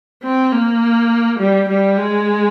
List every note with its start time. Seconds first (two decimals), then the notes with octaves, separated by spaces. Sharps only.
0.23 C4
0.52 A#3
1.39 G3
1.68 G3
1.97 G#3